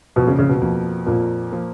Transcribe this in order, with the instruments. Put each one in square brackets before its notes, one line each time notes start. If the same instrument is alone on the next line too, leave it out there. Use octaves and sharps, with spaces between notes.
[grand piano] F2 F3 A#3 [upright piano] B2
[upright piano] C#3
C#3
B2
[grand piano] F2 F3 A#3
[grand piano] F2 F3 A#3 [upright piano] A#2
[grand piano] F3 A#3